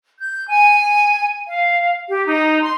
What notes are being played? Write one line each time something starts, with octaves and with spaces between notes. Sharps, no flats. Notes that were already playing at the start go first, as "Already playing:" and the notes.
G6
G#5
F5
G4
D#4
C6